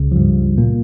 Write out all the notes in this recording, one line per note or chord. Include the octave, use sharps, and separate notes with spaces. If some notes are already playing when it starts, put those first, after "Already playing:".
Already playing: C#2 C#3
F3
G2 G3
A#2 A#3